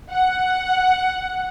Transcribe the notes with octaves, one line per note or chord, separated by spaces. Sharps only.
F#5